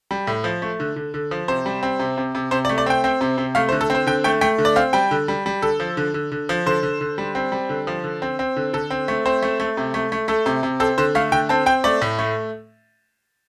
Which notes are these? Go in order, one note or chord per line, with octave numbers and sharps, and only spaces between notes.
G3
A2
F3
A3
D3
D3
D3
F3
C3 C5
G3
C4
C3
C3
C3
C3 C5
D5
A3
D5
C4 G5
C4
C3
C3
A3 F5
C5
D3
A4
C4 C5
D3 G5
A3 G5
A3 G5
D3
D5
C4 F5
G3 G5
D3
G3
G3
D3 A4
F3
D3
D3
D3
F3
D3 C5
D3
D3
G3
C4
G3
D3
F3
D3
C4
C4
D3
D3 A4
C4
A3
C4 C5
A3
A3
C3
A3
A3
A3 A4
C3
C3
C4 A4
D3 C5
A3 F5
D3 G5
C4 A5
C4 G5
A3 D5
A2
A3